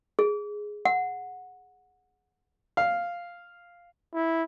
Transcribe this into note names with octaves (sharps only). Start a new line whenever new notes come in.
G#4
F#5
F5
E4